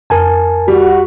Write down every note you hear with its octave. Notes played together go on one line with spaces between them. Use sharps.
F2 A#4 G#5 A5
G3 F#4